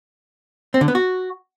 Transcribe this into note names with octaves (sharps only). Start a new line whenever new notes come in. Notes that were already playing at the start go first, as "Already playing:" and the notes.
C4
D3
B3
F#4